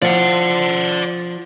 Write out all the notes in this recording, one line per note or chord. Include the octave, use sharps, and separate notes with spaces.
F3 D5 F#5